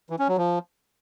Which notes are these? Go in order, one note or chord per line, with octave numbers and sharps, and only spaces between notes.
E3
C#4
F#3
F3